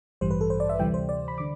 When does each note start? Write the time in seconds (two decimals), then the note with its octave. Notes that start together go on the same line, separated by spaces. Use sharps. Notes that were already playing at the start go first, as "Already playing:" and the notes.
0.21 A1 G2 E3 G3 C5
0.31 B4
0.41 A4
0.50 C5
0.60 D5
0.69 E5
0.79 D2 C3 E3 G3 G5
0.94 C5
1.09 D5
1.28 B5
1.38 D3 D6